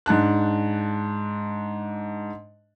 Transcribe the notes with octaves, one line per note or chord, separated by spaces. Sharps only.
G#2 D4 A5 F#6